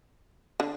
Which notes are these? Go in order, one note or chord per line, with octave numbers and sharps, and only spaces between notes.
D3